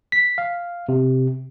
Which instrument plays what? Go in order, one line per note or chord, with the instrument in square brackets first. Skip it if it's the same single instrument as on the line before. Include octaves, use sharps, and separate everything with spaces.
[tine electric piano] B6
F5
C3